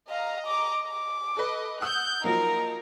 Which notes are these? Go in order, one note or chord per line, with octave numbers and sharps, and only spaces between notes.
D#5 F5 A#5
D6
D6
A4 B4 D#5
F#5 D#6 E6 F#6 G6
F3 F#3 A#3 D#4 A#4 A#5